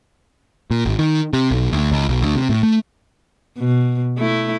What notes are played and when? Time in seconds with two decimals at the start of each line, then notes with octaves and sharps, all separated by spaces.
0.71 A#2
0.86 G#1
0.99 D#3
1.33 C3
1.51 B1
1.73 D2
1.92 C#2
2.09 B1
2.22 D2
2.35 C3
2.49 A2
2.63 A3
3.58 B2
4.18 A3 E4